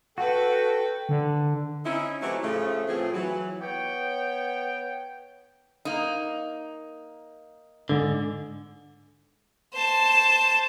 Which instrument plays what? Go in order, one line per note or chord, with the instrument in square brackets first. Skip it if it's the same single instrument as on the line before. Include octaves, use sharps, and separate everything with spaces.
[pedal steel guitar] F#4 [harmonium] A4 G5 [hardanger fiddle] B4
[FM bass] D3
[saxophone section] C4 C#4 D#4 E4
E3 F#3 A3 C4 E4 G4
A2 C#3 F3 A3
F2 A2 E3 F3 C4 G#4
E3 F#3
[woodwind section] B3 C#5 G5
[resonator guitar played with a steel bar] A#3 D#4
[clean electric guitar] G#2 D3
[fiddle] C5 A5